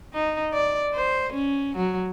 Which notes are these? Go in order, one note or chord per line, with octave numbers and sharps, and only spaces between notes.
D#4
D5
C5
C#4
F#3